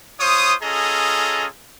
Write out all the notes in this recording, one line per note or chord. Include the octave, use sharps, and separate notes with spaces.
F4 C5 C#5 D#6
C#4 F4 G#4 A4 D#5 A#5